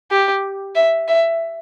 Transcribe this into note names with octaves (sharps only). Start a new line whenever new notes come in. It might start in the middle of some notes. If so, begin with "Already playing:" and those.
G4
E5
E5